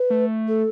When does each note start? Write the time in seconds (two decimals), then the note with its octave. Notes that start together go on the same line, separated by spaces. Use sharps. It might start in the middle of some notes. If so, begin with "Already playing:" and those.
Already playing: B4
0.10 A3
0.48 A4